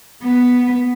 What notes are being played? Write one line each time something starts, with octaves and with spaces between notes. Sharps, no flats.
B3